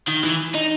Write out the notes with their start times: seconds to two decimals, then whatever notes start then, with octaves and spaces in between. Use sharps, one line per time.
0.08 D#3
0.24 E3
0.55 D#4